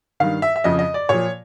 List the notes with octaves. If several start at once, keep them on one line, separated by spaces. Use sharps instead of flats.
G2 D#3 F5
E5
E5
F2 C#3 F3 D#5
D#5
D5
A#2 F3 C#5